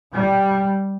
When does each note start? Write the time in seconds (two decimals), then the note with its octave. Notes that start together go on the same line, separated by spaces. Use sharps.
0.13 G3